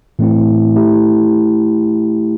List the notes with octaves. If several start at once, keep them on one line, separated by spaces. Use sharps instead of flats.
A2 E3 A3 C4 E4
A3 E4 G4